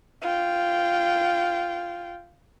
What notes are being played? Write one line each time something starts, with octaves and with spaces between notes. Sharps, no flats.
F4 G5